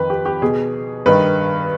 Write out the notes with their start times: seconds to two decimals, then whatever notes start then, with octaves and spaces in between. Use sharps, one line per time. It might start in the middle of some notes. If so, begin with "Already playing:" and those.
Already playing: F2 D#3 B4
0.10 G4
0.26 G4
0.42 B2 G#4
1.06 G2 D#3 B4